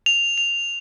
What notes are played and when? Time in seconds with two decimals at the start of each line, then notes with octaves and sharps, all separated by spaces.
0.06 F7
0.38 F7